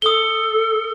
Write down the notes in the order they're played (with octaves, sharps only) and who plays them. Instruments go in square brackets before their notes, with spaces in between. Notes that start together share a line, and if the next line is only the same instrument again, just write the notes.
[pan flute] A4 [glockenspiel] D#6 G7